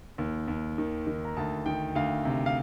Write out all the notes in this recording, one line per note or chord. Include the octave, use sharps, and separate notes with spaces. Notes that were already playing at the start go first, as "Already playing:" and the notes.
D#2
D#2
D#3
D#3
A#5
D2 A5
D#3 G5
D2 F5
C3
F5